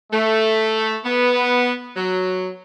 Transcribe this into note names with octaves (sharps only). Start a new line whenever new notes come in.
A3
B3
F#3